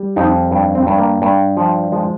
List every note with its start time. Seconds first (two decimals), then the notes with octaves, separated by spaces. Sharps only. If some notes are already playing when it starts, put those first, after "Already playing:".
Already playing: G3
0.16 F2 D#4
0.51 G2
0.75 C4
0.87 G2
0.98 A#3
1.22 G2
1.57 F3
1.92 F3 G#3